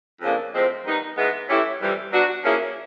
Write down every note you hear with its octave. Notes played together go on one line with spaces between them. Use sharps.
F2 C#3 F3 A#3 D4
A2 F3 G#3 C4
D#3 G3 B3 D#4
G#2 E3 G#3 B3
E3 A3 C#4 E4 G4
F2 C3 E3 G3
F#3 B3 D4 F#4
F3 A#3 C#4 E4 G#4